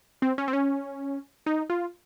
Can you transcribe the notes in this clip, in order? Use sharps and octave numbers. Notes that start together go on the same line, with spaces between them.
C4
C#4
C4
C#4
D#4
F4